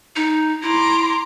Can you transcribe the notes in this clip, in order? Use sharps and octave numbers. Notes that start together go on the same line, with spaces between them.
D#4
E4 A#5 C6 D6